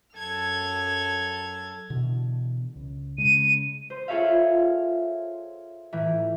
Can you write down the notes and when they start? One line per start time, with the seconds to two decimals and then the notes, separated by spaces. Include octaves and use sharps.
0.16 F#2 A4 A5 F6 G#6
1.90 B2 D3 E3
2.76 C#2
3.18 C#3 G#3 D#7
3.90 C5
4.08 F4 G#4 A4 C#5 E5 F5
5.93 A2 E3